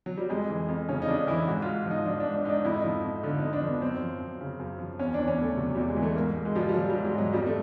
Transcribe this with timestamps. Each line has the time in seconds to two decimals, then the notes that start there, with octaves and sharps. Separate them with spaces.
0.06 F#3
0.18 G3
0.29 F2 G#3
0.50 E3
0.68 F2
0.89 C#3 C#4
1.02 D#4
1.08 F2 D4
1.27 E3 E4
1.47 G#2 F#4
1.62 G#2 F4
1.86 F3
1.91 D#4
2.06 F3 D4
2.20 D4
2.26 G#2
2.36 D4
2.45 G#2 D#4
2.50 D4
2.65 F2 E4
2.74 D#4
2.82 F3 E4
3.04 F2
3.23 D3 F4
3.38 F2 D#4
3.53 D4
3.62 F3
3.67 B3
3.81 F#2 C4
4.02 F3
4.21 F#2
4.41 C#3
4.60 F#2
4.79 F3
4.99 E2 C#4
5.14 E3 D4
5.28 C#4
5.38 E2 A3
5.57 C3 F#3
5.75 E2 G3
5.89 G#3
5.96 E3
6.03 A3
6.16 G#2 A#3
6.36 G#2
6.45 G#3
6.55 F3 G3
6.69 G3
6.74 F3 F#3
6.90 G3
6.95 G#2
7.05 G#3
7.14 G#2 F#3
7.33 F2 G3
7.47 A3